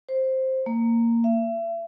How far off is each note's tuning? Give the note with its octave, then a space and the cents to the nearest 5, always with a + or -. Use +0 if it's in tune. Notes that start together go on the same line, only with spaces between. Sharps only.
C5 +5
A#3 -10
E5 +35